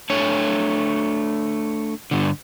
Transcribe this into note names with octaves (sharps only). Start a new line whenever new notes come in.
A3 D4 C#5
G2 D3